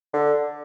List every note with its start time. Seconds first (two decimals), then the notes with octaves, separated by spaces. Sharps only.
0.13 D3